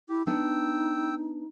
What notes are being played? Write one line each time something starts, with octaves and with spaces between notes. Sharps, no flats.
E4 G4
B3 D4 D#4 G5 E6